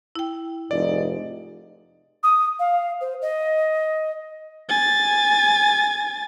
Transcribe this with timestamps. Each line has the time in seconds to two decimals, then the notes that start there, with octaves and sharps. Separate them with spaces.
0.15 E4 G5
0.71 F1 G#2 D5 D#5
2.23 D#6
2.59 F5
3.01 C5
3.22 D#5
4.69 G#5 A6